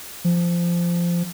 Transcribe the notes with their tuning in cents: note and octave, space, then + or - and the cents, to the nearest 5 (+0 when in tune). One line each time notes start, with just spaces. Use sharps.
F3 -15